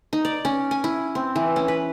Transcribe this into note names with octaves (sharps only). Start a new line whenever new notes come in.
D#4
D5
C#4
G#5
E4
C4
E3
C#4
B4